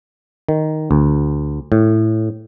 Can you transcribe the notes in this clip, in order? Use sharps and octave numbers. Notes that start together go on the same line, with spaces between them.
D#3
D2
A2